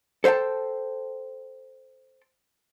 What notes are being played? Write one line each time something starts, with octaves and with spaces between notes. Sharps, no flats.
A4 C5 E5 G5 A5